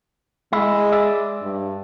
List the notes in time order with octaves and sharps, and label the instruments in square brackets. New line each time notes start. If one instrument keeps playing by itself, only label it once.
[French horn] G#3 [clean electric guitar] E4
[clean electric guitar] D5 E5
[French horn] G2